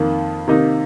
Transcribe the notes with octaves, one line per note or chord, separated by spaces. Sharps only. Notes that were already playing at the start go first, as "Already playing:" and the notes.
Already playing: F2 D#3 A#3
C3 D#3 A#3 D#4